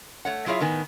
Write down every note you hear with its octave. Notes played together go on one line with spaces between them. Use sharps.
A3 C#5 F#5
F#3 E4 F4 G#4 C#5 E5
A2 D#3 B3 G#5